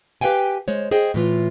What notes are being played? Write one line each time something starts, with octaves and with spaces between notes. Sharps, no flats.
G4 B4 D5 F5 G5 G#5
G#3 C5 C#5
G#4 C5 D#5 G5
A2 E3 F4